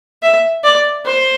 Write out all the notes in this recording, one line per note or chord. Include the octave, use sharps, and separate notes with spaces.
E5
D5
C5